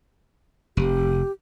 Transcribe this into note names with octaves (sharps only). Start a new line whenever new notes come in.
F1 G4